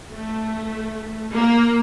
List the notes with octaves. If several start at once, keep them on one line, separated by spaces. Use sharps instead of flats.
A3
A#3